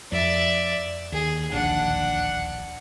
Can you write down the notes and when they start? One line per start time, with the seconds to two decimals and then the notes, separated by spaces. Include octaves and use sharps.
0.12 F2 D5 E5
1.12 D#2 G#4
1.52 D1 A#1 D#2 D4 F#5